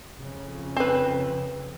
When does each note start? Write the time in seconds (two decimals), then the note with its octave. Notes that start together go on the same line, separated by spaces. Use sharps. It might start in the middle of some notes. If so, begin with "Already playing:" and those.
0.18 F2 C#3
0.77 C4 B4